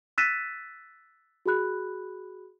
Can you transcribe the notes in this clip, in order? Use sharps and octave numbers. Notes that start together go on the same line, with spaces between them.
E6 F#6 A6 B6 D#7 E7
F#4 G#4 B5 F#6